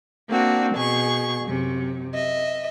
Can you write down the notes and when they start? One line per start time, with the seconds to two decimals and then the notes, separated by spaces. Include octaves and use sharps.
0.30 A#3 C4 D4 F#4
0.75 B2 G#4 C#6
1.45 F#2 C3
2.14 D#5 E5